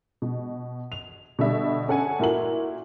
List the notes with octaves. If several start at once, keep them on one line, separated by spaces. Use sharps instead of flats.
B2
F7
B2 D3 G3 E5
C#4 A4 F#5 G#5
A#2 E4 F#4 A#4 F#7